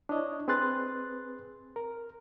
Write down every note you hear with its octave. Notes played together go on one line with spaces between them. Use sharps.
D4 E4 C#5 D#5
C4 G#4 B4 C6 F#6 A6
A#4